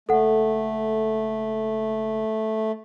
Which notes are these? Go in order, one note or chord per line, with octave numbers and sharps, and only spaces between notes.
F#1 A3 A4 F#5